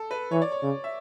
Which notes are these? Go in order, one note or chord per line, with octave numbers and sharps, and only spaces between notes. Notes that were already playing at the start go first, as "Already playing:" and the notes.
Already playing: A4
B4
E3 C#5
D5
C#5
C#3
E5